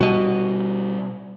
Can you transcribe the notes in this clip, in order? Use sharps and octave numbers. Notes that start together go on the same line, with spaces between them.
B2 G3 F#4 D#5